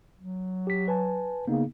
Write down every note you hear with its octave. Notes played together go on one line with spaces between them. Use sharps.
F#3
G4 B6
B4 G#5 A5
C#3 A#3 B3 D#4